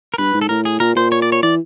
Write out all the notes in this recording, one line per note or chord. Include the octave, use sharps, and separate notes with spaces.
A#4
G2 B4
G#2
A4
A2 A#4
G#4
A#2 A#4
A#2 C5
C#5
D5
C#5
E3 D5